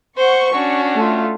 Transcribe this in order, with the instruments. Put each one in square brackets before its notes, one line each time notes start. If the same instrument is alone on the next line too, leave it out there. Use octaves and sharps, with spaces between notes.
[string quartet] C5 F#5 [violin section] C#6
[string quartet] C#4 D4 F#4
[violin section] A3 F4